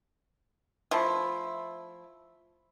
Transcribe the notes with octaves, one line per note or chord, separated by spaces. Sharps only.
F3 A3 E4